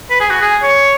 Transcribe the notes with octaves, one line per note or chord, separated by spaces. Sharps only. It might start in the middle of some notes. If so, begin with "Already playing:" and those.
B4
G#4
F#4
G#4
C#5